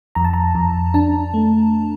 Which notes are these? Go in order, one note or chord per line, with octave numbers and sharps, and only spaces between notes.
F2 A#5
A5
A#5
F2
D4 A5
A3